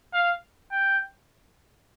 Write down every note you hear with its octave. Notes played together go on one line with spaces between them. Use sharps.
F5
G5